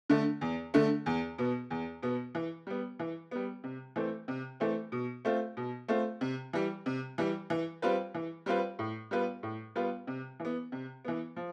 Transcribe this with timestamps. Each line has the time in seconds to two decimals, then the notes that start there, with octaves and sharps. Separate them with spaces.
0.10 D3 A3
0.41 E2
0.74 D3 A3
1.06 E2
1.38 B2 B3
1.70 E2
2.03 B2 B3
2.35 E3
2.67 G3 B3
2.99 E3
3.31 G3 B3
3.64 C3
3.96 E3 A3 C4
4.28 C3
4.60 E3 A3 C4
4.92 B2
5.25 A3 C4 F4
5.57 B2
5.88 A3 C4 F4
6.21 C3
6.53 E3 G3
6.86 C3
7.18 E3 G3
7.50 E3
7.82 G3 C4 F4 B4
8.14 E3
8.46 G3 C4 F4 B4
8.79 A2
9.11 G3 B3 F4 B4
9.43 A2
9.75 G3 B3 F4 B4
10.07 C3
10.40 E3
10.45 B3
10.72 C3
11.05 E3 B3
11.36 F3